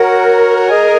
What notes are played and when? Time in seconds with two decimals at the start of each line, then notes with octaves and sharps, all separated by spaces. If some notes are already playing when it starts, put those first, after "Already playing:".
Already playing: F#4 A#4 C#5 F#5
0.68 G#4 D#5 G#5